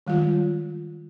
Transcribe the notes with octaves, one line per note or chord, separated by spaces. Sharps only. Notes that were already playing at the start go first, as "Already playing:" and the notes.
D#3 G3 G#3 F4